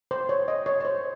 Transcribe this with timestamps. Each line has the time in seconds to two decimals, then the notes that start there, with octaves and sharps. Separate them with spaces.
0.11 C5
0.29 C#5
0.48 D#5
0.66 C#5
0.80 C#5
0.85 C5